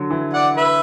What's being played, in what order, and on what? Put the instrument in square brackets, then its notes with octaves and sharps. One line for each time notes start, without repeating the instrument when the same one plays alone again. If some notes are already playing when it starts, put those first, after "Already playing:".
Already playing: [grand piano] D3 F#3
E3
[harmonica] D5 F#5
B4 E5